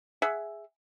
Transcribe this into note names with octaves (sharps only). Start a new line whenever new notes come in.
G#4 E5 F#5